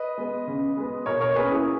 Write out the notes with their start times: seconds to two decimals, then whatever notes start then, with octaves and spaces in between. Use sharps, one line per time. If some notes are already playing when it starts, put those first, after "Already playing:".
Already playing: B4 D#5
0.18 G#3 B3
0.47 C#3
0.77 G#3 B3
1.06 B2 A#4 C#5
1.21 A#4 C#5
1.36 A#3 C#4 G#4 B4
1.51 E4 G#4